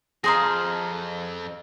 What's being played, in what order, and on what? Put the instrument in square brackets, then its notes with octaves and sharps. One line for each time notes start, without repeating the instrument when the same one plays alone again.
[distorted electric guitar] F2 [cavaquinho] G#4 C5 F5 [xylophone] A#5 D#6 A#6